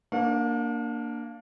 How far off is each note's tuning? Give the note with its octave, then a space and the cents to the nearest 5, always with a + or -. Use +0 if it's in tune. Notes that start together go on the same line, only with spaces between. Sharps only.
A#3 -5 D4 +0 F5 +45